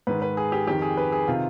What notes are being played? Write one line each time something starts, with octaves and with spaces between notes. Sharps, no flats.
G#2 D#3 B4
B4
G#4
G4
F2 D#3 G4
G#4
B4
G#4
C3 D#3 F4